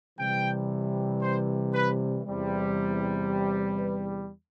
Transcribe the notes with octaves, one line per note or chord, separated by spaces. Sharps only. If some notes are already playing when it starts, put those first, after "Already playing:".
C3 E3 G3 G5
C5
B4
E2 C3 G3
B4